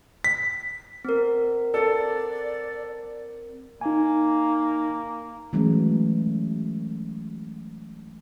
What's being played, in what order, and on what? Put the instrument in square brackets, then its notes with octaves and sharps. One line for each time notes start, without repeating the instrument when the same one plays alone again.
[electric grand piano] B6
[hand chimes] C4 A#4
[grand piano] A4 [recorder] D5
[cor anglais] A#3 [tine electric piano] D#4 G#5
[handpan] E3 F#3 G#3 A3 C#4